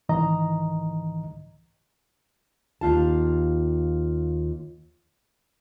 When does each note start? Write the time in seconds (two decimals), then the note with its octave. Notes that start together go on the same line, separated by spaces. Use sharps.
0.09 C2 G#2 D#3 E3 D#5 A#5
2.81 D#2 F4 A5